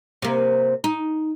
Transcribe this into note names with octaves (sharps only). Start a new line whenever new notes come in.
C3 A#3
D#4